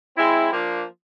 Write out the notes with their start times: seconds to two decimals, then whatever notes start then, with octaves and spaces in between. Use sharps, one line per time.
0.16 G#3 C4 E4
0.49 F3 A#3 D4